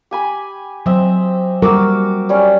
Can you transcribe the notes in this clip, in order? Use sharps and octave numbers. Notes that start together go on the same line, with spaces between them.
G4 G#5 B5
F#3 C4 D#5 E5
G3 F#4 A#4 D6 E6
G3 C#4